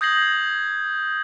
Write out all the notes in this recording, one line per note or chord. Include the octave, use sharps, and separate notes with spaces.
D#6 G6 G#6 A#6 C7 F#7